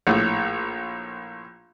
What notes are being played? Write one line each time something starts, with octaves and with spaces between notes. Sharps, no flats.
A#1 A2